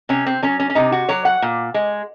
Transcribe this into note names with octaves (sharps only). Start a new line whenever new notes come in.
C3 C#4
C4
F#3 C#4
C#4
C#4
C3 D#4
F#4
F#3 C#5
F#5
A#2
G#3